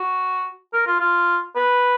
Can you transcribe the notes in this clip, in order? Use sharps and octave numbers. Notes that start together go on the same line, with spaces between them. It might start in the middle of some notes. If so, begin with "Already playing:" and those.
Already playing: F#4
A#4
F4
F4
B4